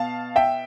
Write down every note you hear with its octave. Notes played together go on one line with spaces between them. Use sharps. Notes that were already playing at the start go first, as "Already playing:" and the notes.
Already playing: B2 F5 A5
E5 G5